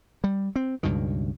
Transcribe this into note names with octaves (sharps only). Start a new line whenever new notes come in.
G3
C4
C#2 G2 B2 D#3